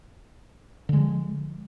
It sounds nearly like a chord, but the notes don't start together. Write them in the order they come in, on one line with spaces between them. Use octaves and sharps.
D3 G#3 F3